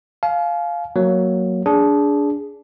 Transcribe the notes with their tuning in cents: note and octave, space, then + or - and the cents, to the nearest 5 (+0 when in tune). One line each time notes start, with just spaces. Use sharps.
F5 +0 G#5 +45
F#3 +0 A#3 +0
D4 -20 G#4 +0